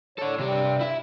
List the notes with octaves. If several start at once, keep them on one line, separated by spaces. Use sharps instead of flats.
A2 A4 C#5 D5
G2 C3 G3 G4
E4 E5